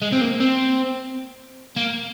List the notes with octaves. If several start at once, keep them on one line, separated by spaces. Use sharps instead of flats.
G#3
C4
A#3
C4
A#3